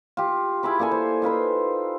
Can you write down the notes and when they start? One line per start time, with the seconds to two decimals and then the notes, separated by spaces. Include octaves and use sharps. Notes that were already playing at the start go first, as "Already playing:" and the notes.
0.17 F4 G4
0.63 E4 G#4 B5 D6
0.79 A#3 D4 A4 G#5
0.92 C5
1.22 D#4 F4 B4 C5